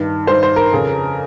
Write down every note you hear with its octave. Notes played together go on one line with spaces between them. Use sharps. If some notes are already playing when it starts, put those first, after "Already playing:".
Already playing: G2 D#3
G2 D#3 C5
C5
A#4
F2 C#3